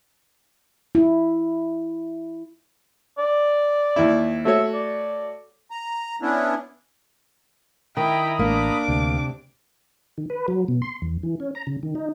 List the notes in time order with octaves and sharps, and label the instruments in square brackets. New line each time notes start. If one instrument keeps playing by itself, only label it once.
[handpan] E4
[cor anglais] D5
[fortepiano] D#2 E4
[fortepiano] A3 F#4 C#5 [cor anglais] E5
[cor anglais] D5
[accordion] A#5
B3 C#4 D4 E4
[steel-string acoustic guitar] D#3 [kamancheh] E4 G5 [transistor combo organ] A#5 B5 D#6
[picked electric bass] A1 [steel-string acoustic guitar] A#3 [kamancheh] D4 D6
[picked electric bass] D2 [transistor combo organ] C3
[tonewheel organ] D#3
B4
F#3
B2
C6
E2
E3
C#4
A#5
C#3
D#3
D#4